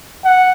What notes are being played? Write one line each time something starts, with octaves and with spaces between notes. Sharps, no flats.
F#5